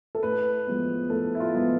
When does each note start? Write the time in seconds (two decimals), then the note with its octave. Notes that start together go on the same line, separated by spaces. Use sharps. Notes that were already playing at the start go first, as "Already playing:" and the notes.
0.15 A4
0.23 A2 B4
0.67 F3 G#3 B3
1.10 A2 A4
1.35 E4
1.40 F4
1.54 F3 G#3 B3